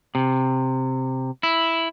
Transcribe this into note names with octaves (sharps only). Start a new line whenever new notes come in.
C3
E4